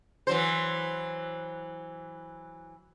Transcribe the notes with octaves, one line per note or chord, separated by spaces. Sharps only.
E3 F#3 C5